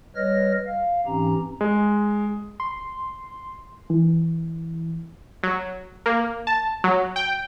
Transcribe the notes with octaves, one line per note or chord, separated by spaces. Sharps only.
G3 B4 C#5 D#5 F6 A#6
F5
G#2 E3 C4 C#4 G4 A#5
G#3
C6
E3
F#3
A#3
A5
F#3
G5